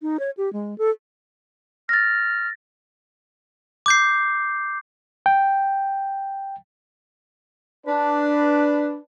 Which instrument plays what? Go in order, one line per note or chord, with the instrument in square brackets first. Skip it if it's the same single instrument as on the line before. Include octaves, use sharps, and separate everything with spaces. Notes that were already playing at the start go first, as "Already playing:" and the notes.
[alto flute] D#4
C#5
G4
G#3
A4
[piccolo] F6 [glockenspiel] A6 A#6
[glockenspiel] D6 G6 C7
[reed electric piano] G5
[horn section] D4 B4